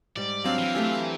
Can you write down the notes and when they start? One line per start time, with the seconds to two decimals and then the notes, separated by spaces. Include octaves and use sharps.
0.16 G#2 G3 D5
0.44 F#3 C4 D4 F5
0.58 E3
0.75 A3 G4 G#5